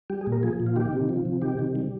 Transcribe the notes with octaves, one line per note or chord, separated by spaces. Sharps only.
G3 G4
G#4
A#2
A#4
F3 G#4
A#2
F4
D#3 G4
C3
F3
C3
D#3 G4
C3
G3